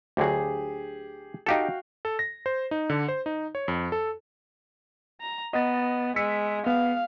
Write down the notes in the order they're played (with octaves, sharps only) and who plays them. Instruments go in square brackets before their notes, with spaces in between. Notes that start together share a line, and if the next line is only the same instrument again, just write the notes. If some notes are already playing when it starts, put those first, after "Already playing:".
[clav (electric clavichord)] D2 D3 F#3 [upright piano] G4 G#4
[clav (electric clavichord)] D#4 G4 A4 [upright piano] F#4 F5 G5
[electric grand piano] A4
A#6
C5
D#4
D3
C5
D#4
C#5
F2
A4
[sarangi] A#5
[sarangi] B3 [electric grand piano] D#5 A6
[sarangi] G#3 [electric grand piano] E6 B6 C#7
[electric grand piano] B3 [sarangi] F5